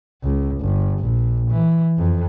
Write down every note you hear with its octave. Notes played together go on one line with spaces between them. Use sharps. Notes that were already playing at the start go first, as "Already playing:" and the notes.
C#2
G1
A#1
E3
F2